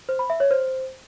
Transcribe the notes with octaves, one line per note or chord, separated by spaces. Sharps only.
C5
B5
E5
C#5
C5